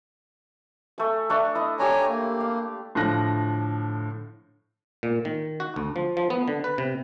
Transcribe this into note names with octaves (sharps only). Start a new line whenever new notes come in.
A3 G#5
A3 D4 C#6
E4 D#5
D4 G4 C#5 G#5 A#5
A#3
F5
A2 D3 F3 F#6 A#6
A#2
D#3
F#4
D2
F3
F3
B3
D3
B4
C3